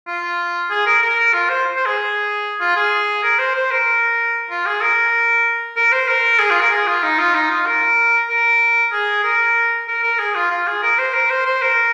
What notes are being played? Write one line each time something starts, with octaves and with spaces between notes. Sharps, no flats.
F4
G#4
A#4
A#4
F4
C5
C5
G#4
F4
G#4
A#4
C5
C5
A#4
F4
G#4
A#4
A#4
C5
A#4
G#4
F4
A#4
G#4
F4
D#4
F4
D#4
F4
A#4
A#4
G#4
A#4
A#4
A#4
G#4
F4
F4
G#4
A#4
C5
A#4
C5
C5
A#4